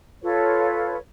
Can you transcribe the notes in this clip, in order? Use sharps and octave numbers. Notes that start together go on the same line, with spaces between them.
F4 A4 B4 C#5